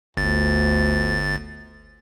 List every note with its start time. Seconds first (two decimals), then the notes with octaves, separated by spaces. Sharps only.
0.17 G1 D2 A6